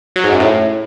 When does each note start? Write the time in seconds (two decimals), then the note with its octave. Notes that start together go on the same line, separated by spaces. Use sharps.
0.16 F#3
0.24 G#2
0.32 F#2
0.40 A2